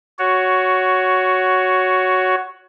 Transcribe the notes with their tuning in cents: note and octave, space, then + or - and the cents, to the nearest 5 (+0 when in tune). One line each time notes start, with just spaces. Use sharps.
F#4 +0 C#5 +10